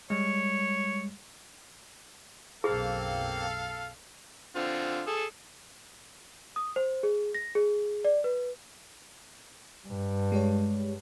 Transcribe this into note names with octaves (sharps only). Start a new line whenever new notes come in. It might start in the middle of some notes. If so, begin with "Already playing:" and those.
G3 G#3 C#5
B1 F#2 A#3 C4 G#4 A4 F5
D3 C4 F4
G#4 A4
D#6
C5
G#4
A#6
G#4
D5
B4
G2
G#3 G4 C#5